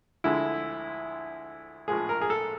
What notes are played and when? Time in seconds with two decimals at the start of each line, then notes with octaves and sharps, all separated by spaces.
0.24 D2 D3 F3 G#3 E4
1.88 A#1 A2 F3 G#3 G#4
2.09 A#4
2.21 G#4
2.30 A4